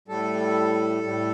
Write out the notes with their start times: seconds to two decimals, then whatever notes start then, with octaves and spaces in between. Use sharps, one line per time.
0.08 A2 G3 A4
1.03 A2 G3